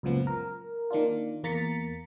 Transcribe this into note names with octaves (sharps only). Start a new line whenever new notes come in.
C#2 F#2 A#2 F3 B3
A#4
D#3 A#3 D4 F4
E2 A#3 A#5 A6 B6 C#7